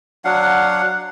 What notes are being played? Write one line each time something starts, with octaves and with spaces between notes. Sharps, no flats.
F#3 D4 F5 F#5